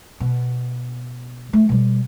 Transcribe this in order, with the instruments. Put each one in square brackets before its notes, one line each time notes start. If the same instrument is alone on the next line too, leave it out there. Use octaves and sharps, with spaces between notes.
[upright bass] B2
A3
B2 G3